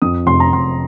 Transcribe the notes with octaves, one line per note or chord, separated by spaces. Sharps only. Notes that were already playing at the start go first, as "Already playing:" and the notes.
F2 D#6
F1 C6
A#5
F1 C6